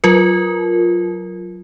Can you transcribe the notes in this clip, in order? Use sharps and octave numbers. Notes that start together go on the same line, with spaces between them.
F#3 F4 A#4